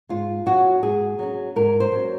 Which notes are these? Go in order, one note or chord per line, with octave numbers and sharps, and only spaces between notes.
G#2 F4
F#3 C#4 F#4
G#2 G#4
F#3 C#4
G#2 A#4
C5
F#3 C#4